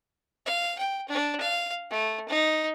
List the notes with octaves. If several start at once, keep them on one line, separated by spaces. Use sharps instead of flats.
F5
G5
D4
F5
A3
D#4